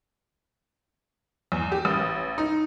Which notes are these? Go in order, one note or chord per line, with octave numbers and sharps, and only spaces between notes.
E2
G4
A1
D#4